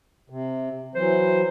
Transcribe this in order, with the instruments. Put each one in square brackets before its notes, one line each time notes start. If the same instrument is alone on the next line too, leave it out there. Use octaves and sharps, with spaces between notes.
[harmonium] C3
[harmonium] E3 F#3 [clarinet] C5